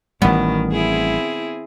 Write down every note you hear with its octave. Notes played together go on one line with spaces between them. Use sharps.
A1 D#3 G3 B3
C4 E4 G#4